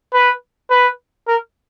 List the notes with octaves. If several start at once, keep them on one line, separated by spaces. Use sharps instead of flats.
B4
B4
A#4